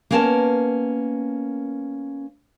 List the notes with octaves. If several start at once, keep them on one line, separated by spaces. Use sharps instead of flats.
A#3 B3 C#4 A#4 G#5 A5